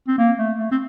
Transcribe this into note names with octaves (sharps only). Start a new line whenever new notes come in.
C4
A#3
A3
A3
C4